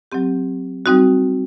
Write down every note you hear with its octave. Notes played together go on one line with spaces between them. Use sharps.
F#3 C4 G4
G3 C4 D#4 F#4